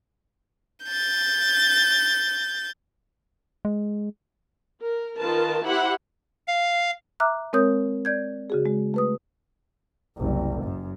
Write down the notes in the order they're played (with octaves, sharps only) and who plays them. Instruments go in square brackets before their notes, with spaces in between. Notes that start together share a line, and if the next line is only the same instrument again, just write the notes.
[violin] G6 A6
[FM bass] G#3
[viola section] A#4
D#3 F4 A#4 B4 A5
E4 G4 C5 F#5 B5
[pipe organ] F5
[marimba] E5 A#5 D6 F6 F#6
G#3 C4 A#4 C#5 D#6 G6
D5 G6 G#6
C#3 F#4 G#4
G#3
A3 B4 D#6
[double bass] F#1 C2
F#2